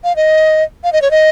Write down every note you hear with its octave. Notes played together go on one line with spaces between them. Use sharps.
F5
D#5
F5
D#5
C#5
D#5